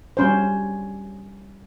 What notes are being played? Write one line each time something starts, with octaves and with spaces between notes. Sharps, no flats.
G3 C#4 C5